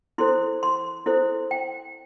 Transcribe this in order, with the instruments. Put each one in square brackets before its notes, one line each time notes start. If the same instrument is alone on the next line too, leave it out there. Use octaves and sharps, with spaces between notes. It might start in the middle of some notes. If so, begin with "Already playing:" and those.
[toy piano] E4 A4 C5 C6
C6
E4 A4 C5
G5